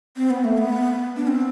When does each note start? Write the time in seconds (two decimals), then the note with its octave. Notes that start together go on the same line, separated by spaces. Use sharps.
0.17 C4
0.30 B3
0.44 A3
0.58 B3
1.17 D4
1.28 C4